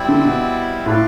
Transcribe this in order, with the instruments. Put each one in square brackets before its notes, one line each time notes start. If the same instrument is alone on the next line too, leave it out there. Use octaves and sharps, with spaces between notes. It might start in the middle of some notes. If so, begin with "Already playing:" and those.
Already playing: [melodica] G3 C4 E4
[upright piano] D3
B2
[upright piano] A2 [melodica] F4 B4 D5 F5